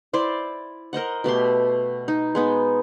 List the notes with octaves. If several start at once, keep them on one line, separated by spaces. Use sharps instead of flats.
E4 C5 D5
A#4 C5 D#5 F#5
B2 A3 G4 C6
D#4
G#3 B3 D#4